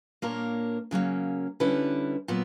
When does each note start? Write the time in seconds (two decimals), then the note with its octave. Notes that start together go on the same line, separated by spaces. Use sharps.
0.22 A#2 A#3 D4 A#4 C#5
0.91 C#3 F#3 A#3 C#4
1.60 D3 G3 C#4 E4 B4
2.28 A#2 F#3 B3